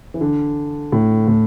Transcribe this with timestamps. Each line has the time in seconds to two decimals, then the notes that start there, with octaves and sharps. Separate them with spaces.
0.14 E3
0.21 D3
0.92 A2
1.28 A2